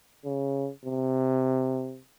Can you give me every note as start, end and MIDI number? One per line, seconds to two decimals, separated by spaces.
0.25 0.69 49
0.85 1.99 48